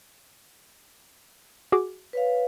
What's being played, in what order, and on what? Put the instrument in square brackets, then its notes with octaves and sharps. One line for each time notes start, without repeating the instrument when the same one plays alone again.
[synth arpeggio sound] F#4 G#4 D6
[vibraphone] B4 C#5 F5